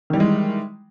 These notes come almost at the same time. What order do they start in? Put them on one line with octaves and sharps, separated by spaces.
D#3 G3 E3 G#3